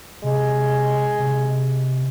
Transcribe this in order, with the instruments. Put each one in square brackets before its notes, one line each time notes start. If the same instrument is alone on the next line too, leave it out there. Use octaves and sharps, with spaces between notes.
[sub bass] C3 [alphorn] G#3
[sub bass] C3